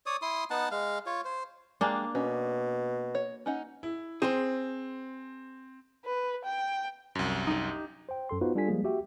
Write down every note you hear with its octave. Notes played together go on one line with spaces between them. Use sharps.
C#5 D5 D#6
E4 C6 D#6
B3 D#4 F#5 A5
G#3 F5
F4 C#5
C5
G#3 A#3 D4 G4 G#4
B2 C#4
C#5
C#4 D#4 F#5
E4
C4 G#4 C5
B4
G5
C2 F#2
D#4 G4
C5 G5
F#2 A4 C6
B3 D#4 F4 F#4 B4 C5
G3 D4 F4 A4 G#5 B6
F3 G3 G#3 A#3 G#4
F#4 G4 E5 G5